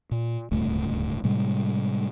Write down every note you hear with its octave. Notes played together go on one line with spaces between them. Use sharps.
A#2
D1 C#2 G2 A3
A2 C3 G3 G#3